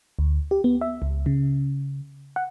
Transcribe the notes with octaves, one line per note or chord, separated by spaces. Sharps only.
D2
G4
B3
E5
C#2
C#3
F#5